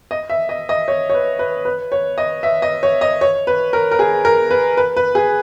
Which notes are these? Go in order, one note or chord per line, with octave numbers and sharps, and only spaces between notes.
D#5
E5
D#5
D#5
C#5
C#5
B4
B4
B4
C#5
D#5
E5
D#5
C#5
D#5
C#5
B4
A#4
A#4
G#4
A#4
B4
B4
B4
G#4